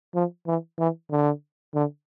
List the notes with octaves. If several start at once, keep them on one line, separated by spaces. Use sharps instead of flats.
F3
E3
E3
D3
D3